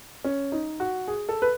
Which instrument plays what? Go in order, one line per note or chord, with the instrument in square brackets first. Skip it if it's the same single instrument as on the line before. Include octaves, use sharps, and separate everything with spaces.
[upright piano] C#4
D#4
F#4
G#4
A4
B4